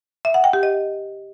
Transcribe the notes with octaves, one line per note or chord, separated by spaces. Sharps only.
E5
F#5
G5
G4
D#5